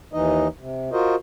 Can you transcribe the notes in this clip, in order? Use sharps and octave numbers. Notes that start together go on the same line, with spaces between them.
D#2 E3 D#4 D#5
C3
F4 F#4 A#4 C5 D#5